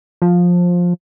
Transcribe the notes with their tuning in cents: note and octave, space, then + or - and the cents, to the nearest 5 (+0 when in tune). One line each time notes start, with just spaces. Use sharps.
F3 +15